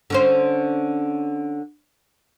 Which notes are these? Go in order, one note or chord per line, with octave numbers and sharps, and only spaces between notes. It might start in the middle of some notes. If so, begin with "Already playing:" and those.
D3 C#4 C5